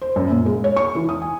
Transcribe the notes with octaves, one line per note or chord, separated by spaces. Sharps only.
C5
F#2
A#2
G#3
C#5
C#6
E3
D#6
G#5